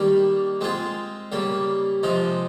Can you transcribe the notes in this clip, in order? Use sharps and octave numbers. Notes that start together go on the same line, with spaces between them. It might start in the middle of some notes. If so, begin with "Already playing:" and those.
Already playing: D#3 G3 A#3
G#3 C4 F4 G#4
C#3 G3 A#3
C3 F3 G#3 D#4